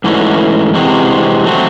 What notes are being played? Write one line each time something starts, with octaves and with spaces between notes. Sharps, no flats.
G#2 E3 A3 C#4 F#4
C3 E3 G#3 C4 F#4
F#3 A3 C4 F#4